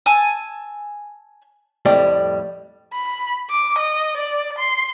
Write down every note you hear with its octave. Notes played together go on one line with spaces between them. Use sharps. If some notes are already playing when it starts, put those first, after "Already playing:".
G#5 A5 E6
F2 A2 G3 A3 D5 G5
B5
D6
D#5
D5
C6